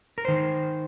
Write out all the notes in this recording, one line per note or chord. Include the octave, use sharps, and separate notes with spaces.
A#4
D#3 C5